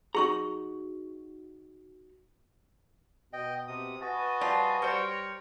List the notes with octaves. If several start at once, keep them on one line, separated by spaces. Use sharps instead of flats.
D#4 F#4 G#4 A#5 C#6
B2 D#5 G5
C3 D#6
F#4 B4 D#5 G#5 A5
F3 G3 F4
G3 A#4 C5 C#5 G5